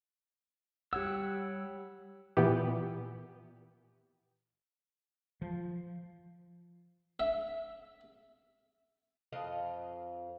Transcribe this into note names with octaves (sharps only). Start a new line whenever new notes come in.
G3 G4 C#5 F#5 E6
A#2 E3 B3 G4
F3
E5
F2 D#5 F5